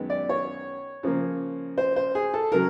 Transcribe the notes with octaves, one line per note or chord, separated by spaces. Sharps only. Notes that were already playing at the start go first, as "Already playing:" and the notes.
Already playing: F#2 D#3 G#3 B3
D5
C#5
C#3 F3 A#3
C5
C5
G#4
A4
C#3 F#3 A#4